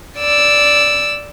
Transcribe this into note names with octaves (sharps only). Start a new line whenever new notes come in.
D5 E6